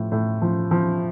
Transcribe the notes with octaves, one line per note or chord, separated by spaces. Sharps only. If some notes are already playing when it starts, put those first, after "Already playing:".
Already playing: A2 F3
A2
F3
F3